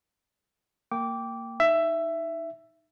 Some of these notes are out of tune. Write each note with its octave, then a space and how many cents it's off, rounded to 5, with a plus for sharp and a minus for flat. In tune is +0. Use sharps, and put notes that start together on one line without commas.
A#3 -20 G5 +0 D6 -15
D#4 +0 E5 +15